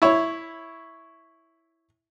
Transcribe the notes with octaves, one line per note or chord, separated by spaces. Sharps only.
E4 C#5